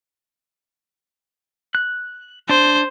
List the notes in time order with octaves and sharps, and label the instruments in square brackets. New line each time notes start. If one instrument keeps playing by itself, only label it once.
[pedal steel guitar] F#6
[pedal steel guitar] D4 [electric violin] C5